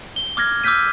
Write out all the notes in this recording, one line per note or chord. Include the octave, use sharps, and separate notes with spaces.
G7
D6 F6 G#6 A#6
D6 E6 F6 G6 B6 D#7